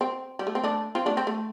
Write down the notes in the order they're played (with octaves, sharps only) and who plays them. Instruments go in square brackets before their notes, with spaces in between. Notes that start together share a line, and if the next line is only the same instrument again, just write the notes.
[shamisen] C4
G3
A3
C4
A3 D4
C4 F4
A3 D4
C4
A3